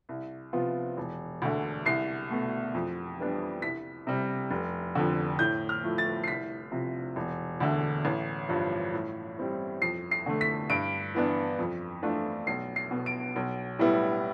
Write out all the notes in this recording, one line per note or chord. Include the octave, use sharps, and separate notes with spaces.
C2
C3 F3 B3 F4
E1
D2 D3
C2 C7
B2 A3
F2
E3 G3 B3 D4
C2 B6
C3 G3
F1
F2 D3
A2 G6
F6
F3 A3 E4
A6
C7
C2 B6
C3 F3
E1
D2 D3
A1
G2 F3
A2
G3 C4 E4
F2 C7
C7
D3 A3
B6
G2 D7
E3 B3 D4
F2
E3 A3 D4 F4
B1 C7
C7
B2 B3
D7
B1
A2 G3 B3 E4